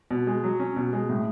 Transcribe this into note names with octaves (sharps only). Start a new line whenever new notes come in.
B2
G#3
F#3
C#4
B2
G#3
A2